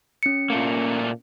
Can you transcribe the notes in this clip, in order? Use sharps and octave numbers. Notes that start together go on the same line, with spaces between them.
C#4 C#7
A#2 A3 A#3